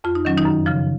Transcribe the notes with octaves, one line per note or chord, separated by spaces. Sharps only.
F2 F4
D#4
D#3 F#3 C#4
D#3 D#4
F#2
C#3 F3